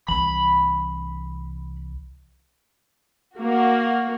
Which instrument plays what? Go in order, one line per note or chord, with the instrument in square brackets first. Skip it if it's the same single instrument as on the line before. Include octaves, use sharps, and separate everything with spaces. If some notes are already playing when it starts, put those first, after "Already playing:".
[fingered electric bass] C2 E3 [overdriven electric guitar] B5
[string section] A#3 F#4